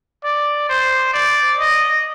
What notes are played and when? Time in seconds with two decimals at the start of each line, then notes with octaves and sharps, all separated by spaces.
0.24 D5
0.69 C5
1.13 D5
1.59 D#5